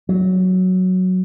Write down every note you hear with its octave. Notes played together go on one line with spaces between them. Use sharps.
F#3